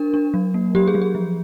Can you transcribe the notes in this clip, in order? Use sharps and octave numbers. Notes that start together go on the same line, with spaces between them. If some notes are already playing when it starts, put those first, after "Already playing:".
Already playing: D4 A#4
D4
F#3
A#3
F#3 G4
G#4
F#3
G#4
F3